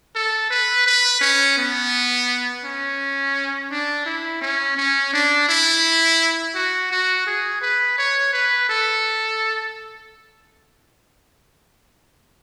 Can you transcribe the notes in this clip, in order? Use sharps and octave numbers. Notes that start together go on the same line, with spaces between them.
A4
B4
B4
C#4
B3
C#4
D4
E4
C#4
C#4
D4
E4
F#4
F#4
G#4
B4
C#5
B4
A4